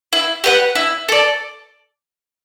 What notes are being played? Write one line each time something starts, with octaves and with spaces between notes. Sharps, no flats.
E4
G4 B4 F#5
E4
A4 D5